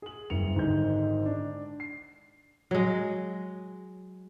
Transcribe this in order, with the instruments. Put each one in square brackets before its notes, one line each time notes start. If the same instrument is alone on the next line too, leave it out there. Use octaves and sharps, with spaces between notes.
[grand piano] G#4 F#7
F#1 G2 C#7 F7
G#1 G#2 D3 G#3 D#4 G6
D4
C7
[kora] F#3 G#3